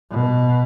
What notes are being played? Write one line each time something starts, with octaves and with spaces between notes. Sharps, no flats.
B2